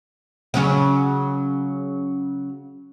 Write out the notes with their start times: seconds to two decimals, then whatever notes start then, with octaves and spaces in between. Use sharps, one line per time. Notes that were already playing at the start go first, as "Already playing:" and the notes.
0.54 C#3 F#3 C#4